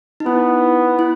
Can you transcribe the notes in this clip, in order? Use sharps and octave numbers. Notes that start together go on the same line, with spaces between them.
D#4
B3 E4
E4